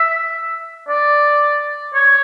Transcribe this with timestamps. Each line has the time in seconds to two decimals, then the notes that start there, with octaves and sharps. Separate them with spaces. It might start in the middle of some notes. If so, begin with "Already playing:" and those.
Already playing: E5
0.89 D5
1.95 C#5